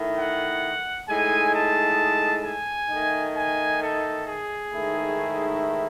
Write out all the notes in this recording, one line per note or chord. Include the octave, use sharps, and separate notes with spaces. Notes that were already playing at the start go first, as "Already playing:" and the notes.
Already playing: D#3 A3 E4
F#5
A2 G#3 D#4 G#5
A5
G#5
D#3 A3 D#4
G#5
A4
G#4
G#2 D#3 A3 E4